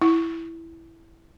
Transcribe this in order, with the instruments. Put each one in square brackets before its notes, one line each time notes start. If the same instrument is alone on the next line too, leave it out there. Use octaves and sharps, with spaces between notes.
[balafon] E4